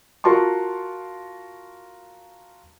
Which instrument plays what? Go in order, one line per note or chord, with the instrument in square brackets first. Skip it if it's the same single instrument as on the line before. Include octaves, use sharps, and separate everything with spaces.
[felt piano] F4 F#4 A#4 A5 C6 C#6